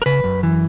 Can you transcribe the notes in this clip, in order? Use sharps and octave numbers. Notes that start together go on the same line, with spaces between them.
A#4
C#3 B4
F#2
E3